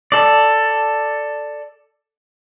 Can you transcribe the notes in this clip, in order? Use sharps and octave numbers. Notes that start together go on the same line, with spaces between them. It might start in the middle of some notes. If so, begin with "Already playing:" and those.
A4 D5